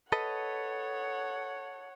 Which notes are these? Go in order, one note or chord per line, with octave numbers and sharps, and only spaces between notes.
A4 B4 C#5 D#5 F#5